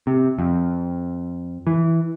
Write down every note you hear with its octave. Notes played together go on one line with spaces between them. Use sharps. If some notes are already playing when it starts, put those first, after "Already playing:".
C3
F2
E3